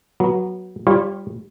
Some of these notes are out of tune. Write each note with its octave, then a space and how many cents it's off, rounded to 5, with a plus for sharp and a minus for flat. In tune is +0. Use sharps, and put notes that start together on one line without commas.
F#3 +0 B3 -25
G3 +0 F4 +0 C#5 -30